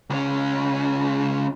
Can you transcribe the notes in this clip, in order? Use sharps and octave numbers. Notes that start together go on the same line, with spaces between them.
C#2 C#4